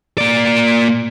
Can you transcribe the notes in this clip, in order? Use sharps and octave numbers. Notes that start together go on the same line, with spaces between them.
A#3 D5